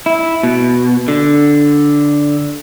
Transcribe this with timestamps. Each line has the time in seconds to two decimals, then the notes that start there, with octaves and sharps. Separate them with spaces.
0.06 E4
0.43 B2
1.08 D3